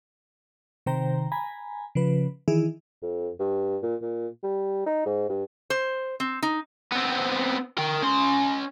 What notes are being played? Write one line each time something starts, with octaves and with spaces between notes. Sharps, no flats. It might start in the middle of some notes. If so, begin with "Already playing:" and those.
C3 D#3 C5 G5 A#5
G#5 A#5 B5
C#3 F3 B4
D#3 E3 E4 G#4
F2
G2
A#2
A#2
G3
D#4
G#2
G2
C5
C4
D#4
B3 C4
A#4 G5
C#4 C6